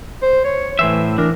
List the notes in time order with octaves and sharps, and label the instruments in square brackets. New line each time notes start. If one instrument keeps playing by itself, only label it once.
[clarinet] C5
C#5
[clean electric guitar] A2 C5 E5 [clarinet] E3
[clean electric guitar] E3 D4 [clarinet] A#4